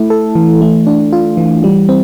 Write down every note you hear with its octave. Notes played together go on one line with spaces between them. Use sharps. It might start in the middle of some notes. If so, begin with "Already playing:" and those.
Already playing: A3 E4
A4
E3
A3
D4
F4
E3
G3
C4